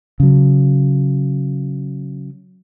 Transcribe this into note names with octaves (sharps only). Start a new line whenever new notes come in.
C#3 F#3